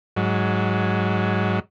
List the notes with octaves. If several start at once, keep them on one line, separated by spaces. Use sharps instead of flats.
G#2 F#3